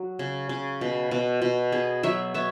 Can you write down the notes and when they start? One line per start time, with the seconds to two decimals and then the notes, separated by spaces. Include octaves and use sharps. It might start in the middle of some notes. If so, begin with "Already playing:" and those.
Already playing: F#3 F#4
0.19 C#3
0.49 C#3
0.81 B2
1.11 B2
1.42 B2
1.72 B3 G#4
2.03 F#3 C#5 E5
2.34 B3 C#5 E5